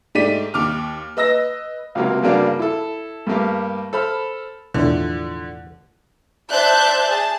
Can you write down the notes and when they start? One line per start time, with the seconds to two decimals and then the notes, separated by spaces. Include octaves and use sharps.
0.15 G#2 A3 G4 D5 B6 D#7
0.54 D#2 D6 F6
1.17 B4 D#5 E6 A#6
1.95 C#2 C3 F#3 A#3
2.23 G2 C#3 F#3 A#3 D4
2.59 E4 A4
3.27 G2 A3 A#3 G4
3.93 A4 C5 B5 F6
4.74 B1 E2 A2 D3 F3
6.51 C5 D5 E5 A5 F#6 G6
7.08 G#4 A5